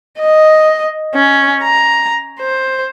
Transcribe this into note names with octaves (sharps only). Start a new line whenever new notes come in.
D#5
C#4
A#5
C5